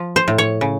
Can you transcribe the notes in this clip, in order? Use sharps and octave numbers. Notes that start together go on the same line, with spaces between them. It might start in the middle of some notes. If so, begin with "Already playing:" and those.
Already playing: F3
C5
A2
C#5
C#3